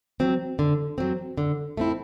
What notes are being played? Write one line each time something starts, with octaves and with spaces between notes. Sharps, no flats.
F#3 C4
D3
F#3 C4
D3
A3 C4 E4